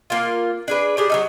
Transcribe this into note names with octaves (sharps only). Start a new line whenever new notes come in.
A#3 F4
D4 G#4 B4
D4 G4 G#4
F#3 C#4 D#4